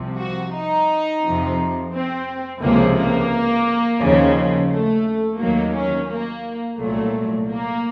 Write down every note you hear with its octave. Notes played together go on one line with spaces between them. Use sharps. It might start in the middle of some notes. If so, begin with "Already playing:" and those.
Already playing: C2 C3 F3
F#4
D#4
F2 C3 F3
C4
C#2 C3 F3 A#3
A#3
D#2 C#3 F3
A3
D#2 D#3 F#3 A#3
C#4
A#3
C2 A#2 F#3 A3
A#3